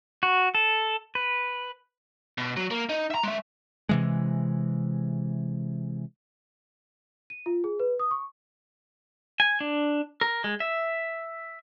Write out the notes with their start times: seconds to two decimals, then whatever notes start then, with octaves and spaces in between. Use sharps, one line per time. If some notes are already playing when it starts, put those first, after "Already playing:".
0.23 F#4
0.55 A4
1.15 B4
2.38 B2
2.57 F#3
2.71 A#3
2.89 D#4
3.11 E5 A#5
3.23 G#3 E5
3.89 C3 E3 G#3
7.30 D#7
7.46 F4
7.64 G#4
7.80 B4
7.99 D#6
8.11 C#6
9.40 G#5
9.60 D4
10.21 A#4
10.44 G#3
10.60 E5